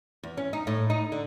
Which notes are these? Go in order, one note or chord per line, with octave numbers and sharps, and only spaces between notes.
E2
C#4
D#4
A2
D#4
D3